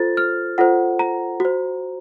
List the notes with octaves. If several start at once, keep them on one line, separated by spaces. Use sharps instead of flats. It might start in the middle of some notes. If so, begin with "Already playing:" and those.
Already playing: F4 A4 C5 A6
F6
F4 A4 C5 F#5
A#5
F#4 C5